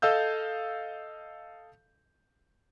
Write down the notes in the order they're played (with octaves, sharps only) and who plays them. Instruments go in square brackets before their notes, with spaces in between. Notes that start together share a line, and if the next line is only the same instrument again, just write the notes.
[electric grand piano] A4 D#5 F5 E6 G6